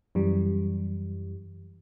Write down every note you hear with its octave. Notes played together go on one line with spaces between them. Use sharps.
F#2 E3 G3